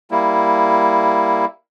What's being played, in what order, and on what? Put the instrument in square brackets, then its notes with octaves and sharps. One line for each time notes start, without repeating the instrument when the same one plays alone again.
[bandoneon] G3 A#3 E4